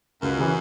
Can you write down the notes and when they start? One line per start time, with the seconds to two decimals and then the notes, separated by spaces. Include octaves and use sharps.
0.22 C#2 F#2
0.39 C#3 E3